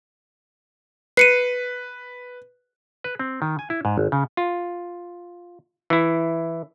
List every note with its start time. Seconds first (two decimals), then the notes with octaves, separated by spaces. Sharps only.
1.17 B4 C7 C#7 D#7
3.04 B4
3.19 C4
3.42 D#3
3.59 G#5
3.70 E4
3.85 G#2
3.98 G#1
4.12 C#3
4.37 F4
5.90 E3 E4